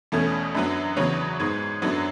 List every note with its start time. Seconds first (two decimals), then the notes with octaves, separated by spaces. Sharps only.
0.12 E2 B2 A3 C#4
0.55 F#2 D3 F#3 B3
0.97 E2 C#3 F#3 B3 C#5
1.40 G#2 G#3 B3
1.82 F#2 D3 F#3 B3